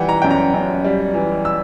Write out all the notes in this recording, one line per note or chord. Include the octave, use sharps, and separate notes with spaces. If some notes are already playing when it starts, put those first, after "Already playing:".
Already playing: E3 G3 F#5 G5
A#5
F#2 G5
A#5
F#2
G3
E3
E6